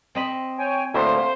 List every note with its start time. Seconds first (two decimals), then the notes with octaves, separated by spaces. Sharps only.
0.15 C4 D#5 B5
0.59 C#5 G5 G#5
0.94 D2 A2 A3 A#3 C5